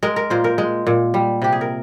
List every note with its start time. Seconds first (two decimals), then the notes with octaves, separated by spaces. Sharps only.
0.03 G#3 A#4
0.16 A#4
0.30 A#2 C5
0.44 A#4
0.58 G#3
0.87 A#2
1.14 G3
1.42 C3 G4
1.52 G#4
1.61 A#4